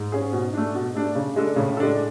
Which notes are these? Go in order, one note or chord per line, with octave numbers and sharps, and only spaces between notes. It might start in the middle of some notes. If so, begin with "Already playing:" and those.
Already playing: G#2
C#4 G#4
B2
A3 D4
B2
A3 D4
C#3
G#3 D4 A4
A2 C#3
G#3 D4 A4